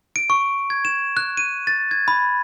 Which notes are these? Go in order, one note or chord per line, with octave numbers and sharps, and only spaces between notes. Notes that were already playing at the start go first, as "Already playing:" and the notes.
D7
C#6
G#6
E7
F#6
D#7
A6
G#6
B5